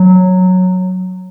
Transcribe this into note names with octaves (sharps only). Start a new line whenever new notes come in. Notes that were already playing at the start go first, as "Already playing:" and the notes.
Already playing: F#3